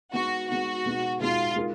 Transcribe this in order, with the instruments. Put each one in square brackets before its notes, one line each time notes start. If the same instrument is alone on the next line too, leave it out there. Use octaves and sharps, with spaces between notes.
[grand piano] G#3 B3 D#4 [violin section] F#4
[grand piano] G#3 B3 D#4 [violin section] F#4
[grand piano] B2 G#3 B3 D#4
[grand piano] B2 G#3 B3 D#4 [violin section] F4
[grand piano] G#3 D#4 A#4